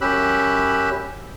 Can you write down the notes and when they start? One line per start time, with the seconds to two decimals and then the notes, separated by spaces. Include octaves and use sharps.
0.01 F#2 C#4 G4 B5 E6 F#6